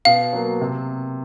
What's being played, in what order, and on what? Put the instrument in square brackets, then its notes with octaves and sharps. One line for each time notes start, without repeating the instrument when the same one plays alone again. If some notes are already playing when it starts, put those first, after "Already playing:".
[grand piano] B2 [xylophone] F5
[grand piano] F#3 A#3
C3